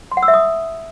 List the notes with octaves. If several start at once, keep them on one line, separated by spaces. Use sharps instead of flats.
C6
F#5
E6
E5
D#6